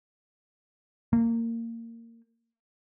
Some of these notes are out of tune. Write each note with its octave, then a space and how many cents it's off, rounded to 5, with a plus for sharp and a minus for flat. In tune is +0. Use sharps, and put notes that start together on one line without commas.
A#3 -20